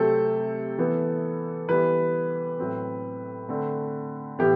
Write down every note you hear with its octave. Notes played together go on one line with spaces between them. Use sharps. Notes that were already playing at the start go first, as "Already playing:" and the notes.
Already playing: C3 F#3 A3 C4 A4
E3 B3
E3 G3 B3 B4
A2 F#3 C4
D3 A3 C4
A2 E3 B3 G4